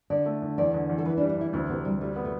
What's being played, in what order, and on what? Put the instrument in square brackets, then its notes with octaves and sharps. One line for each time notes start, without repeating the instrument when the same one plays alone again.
[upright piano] D3 [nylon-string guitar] D5
[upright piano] A3
D3
[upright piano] E2 [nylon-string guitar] D5
[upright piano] D3
E2
[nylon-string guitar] A4
[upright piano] E3 [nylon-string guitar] B4
[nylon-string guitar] D4
[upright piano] G3
[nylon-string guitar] D4
[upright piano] E3 [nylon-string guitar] E4
[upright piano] D2 [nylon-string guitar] C4
[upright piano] C3 [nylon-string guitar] B3
[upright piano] D2 [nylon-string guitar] G3
[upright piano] G3 [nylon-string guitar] A3
[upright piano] B3
[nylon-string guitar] A3